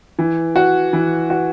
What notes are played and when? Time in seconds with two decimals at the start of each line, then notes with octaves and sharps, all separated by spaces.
0.19 E3
0.56 F#4
0.93 E3
1.30 F#4